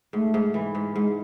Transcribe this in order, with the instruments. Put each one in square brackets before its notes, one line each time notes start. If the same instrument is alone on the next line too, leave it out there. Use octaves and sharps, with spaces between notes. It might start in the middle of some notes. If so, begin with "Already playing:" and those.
[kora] G#2 [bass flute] A3
[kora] G#2
E3
G#2
[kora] G#2 [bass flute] G#3